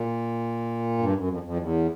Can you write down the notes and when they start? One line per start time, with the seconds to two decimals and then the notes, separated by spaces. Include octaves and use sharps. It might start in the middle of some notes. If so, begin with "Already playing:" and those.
Already playing: A#2
0.98 G2
1.14 F#2
1.28 F2
1.43 F2
1.57 E2